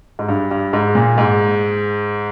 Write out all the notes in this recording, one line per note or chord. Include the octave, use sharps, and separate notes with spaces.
G#2
G2
G2
G#2
A#2
G#2